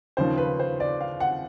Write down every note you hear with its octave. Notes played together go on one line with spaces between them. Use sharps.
D#2 C#3 F3 C5
B4
C5
D5
F5
F#5